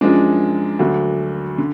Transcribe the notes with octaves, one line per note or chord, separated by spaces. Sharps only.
F#2 F3 G#3 D4
D2 D3 F#3 D4 F#4
D3